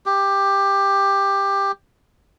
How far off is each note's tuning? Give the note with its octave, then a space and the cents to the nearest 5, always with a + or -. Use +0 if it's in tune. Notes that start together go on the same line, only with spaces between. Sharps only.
G4 +10